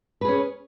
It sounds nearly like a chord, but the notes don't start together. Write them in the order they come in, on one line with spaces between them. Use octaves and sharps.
B4 G#4 C#4